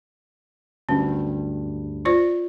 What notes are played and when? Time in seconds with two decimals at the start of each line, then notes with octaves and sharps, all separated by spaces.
0.89 D2 G2 C#4
2.05 F4 C5 D5